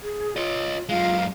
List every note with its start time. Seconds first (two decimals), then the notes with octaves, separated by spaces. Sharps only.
0.03 G#4
0.36 F4 C#5 D#5
0.89 F#2 G#3 F4 F5